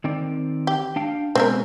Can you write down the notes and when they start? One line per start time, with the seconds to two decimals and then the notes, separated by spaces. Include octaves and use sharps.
0.04 D#3 C4 D5
0.67 G4
0.96 D4 F5 G5
1.35 B2 G#3 C4 C#4 A4 A#4